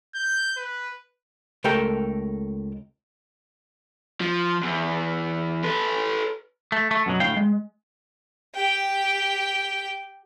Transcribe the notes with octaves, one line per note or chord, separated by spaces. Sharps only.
G6
B4
C#2 A3 G4 A4 A#4 G5
F3
E2
A4 B4
A3
A3
F#2 B2 F#3
D2 A2 F5 G5
G#3
G4 G5